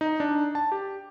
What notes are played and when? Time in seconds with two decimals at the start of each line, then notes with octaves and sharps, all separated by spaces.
0.01 D#4
0.20 D4
0.55 A5
0.72 G4